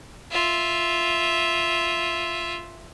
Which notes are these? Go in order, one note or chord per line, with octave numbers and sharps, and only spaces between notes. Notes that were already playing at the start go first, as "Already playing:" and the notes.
F4 E5